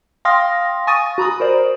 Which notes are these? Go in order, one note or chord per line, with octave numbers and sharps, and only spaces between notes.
F5 G5 C6 D#6 F6 A#6
G#5 C#6 D#6 A6 D#7
F#4 A#5 B5 D#6
A#4 C5 D5